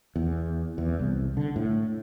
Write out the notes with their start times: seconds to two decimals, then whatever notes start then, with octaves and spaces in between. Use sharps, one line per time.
0.16 E2
0.78 E2
0.99 C2
1.37 D3
1.56 A2